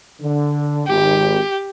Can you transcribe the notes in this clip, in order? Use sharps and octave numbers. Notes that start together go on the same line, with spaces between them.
D3
G#1 G4